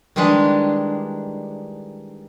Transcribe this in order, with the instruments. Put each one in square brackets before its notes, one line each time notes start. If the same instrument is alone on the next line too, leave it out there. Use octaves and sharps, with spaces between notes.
[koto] D#3 E3 G3 G#3 D4